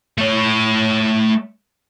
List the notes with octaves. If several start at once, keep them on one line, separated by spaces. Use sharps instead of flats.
A3 C#5